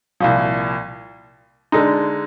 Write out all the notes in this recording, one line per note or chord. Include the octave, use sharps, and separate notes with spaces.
C2 A#2 F3
D3 G#3 D#4